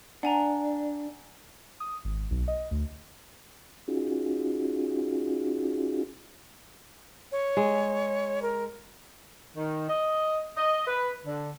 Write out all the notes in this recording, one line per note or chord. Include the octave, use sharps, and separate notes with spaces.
D4 F#5 G#5 A#5
D#6
G#1
B1
D#5
D2
C#4 D#4 F4 F#4 G#4
C#5
G#3
A#4
D#3
D#5
D#5
B4
D3